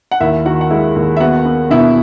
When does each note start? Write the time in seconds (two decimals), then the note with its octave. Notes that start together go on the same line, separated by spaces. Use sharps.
0.11 F#5
0.20 D#2 E4 E5
0.45 D#3 F#4 F#5
0.61 F#5
0.70 G#3 E4 E5
0.96 D#2
1.17 E5
1.20 B3 F#4 F#5
1.45 B3
1.70 B2 E4 E5